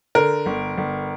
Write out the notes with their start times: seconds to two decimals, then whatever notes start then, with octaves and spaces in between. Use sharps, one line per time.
0.15 D3 A#4
0.46 G1
0.77 G1